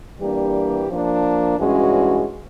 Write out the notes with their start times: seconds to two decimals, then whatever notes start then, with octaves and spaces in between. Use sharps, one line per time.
0.20 E3 G3 A#3 D4 G4
0.89 F3 A#3 D4
1.56 G2 E3 G#3 C#4 F#4